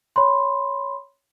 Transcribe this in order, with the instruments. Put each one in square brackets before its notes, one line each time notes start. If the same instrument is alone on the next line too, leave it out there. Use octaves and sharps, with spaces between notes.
[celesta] C#5 B5 C6